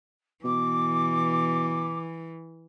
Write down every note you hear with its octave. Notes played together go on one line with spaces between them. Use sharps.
B2 E3 D6